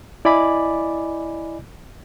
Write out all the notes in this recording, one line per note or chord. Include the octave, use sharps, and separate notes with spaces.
E4 D5 D#5 G#5 B5 D6